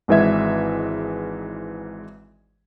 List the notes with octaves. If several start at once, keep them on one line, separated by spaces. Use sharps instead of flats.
G#1 G#2 E3 G#3 E5 G#6